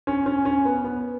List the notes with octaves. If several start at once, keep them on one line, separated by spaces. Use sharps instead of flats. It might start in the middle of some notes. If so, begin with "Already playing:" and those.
C#4
C#4
C#4
B3
B3